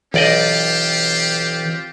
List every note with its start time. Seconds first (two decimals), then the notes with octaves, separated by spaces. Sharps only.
0.14 B1 E3 C4 F4 G4 D5 D#5